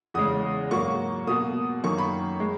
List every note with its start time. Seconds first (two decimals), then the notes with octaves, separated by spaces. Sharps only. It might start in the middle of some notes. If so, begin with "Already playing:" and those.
0.14 E2 C#3 G#3 D#6
0.71 G#2 F#3 A#3 C#6
1.27 B2 A#3 D#6
1.84 F#2 D#3 A#3 C#6
1.98 B5
2.40 G#3